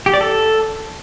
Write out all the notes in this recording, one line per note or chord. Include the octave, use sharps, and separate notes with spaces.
G4
D5
A4